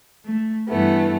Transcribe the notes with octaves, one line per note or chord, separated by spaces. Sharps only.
A3
G2 E3 A3 B3